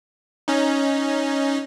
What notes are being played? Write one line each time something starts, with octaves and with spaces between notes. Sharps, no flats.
C#4 D#4